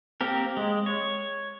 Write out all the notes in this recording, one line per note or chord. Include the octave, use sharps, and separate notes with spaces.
A#3 C4 G4 A#4
G#3
C#5